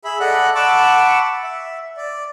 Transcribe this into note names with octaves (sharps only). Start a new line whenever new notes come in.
G#4 E5 B5
A4 D5 D#5 F#5 B5 F#6
F#5 A5 B5 C#6 D6 E6
E5
D5